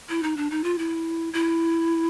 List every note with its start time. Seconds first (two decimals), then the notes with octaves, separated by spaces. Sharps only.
0.09 E4
0.23 D#4
0.37 D4
0.51 D#4
0.64 F4
0.78 E4
1.33 E4